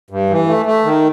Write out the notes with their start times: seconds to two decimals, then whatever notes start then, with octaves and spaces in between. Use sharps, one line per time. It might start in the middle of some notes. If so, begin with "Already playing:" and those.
0.10 G2
0.30 E3
0.47 A3
0.66 A3
0.84 D#3